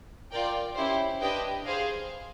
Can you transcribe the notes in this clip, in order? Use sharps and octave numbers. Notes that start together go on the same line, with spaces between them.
F4 A#4 D5 G5
C#4 E4 G4 C5
D4 G4 B4 D#5 G5
G#4 C5 F5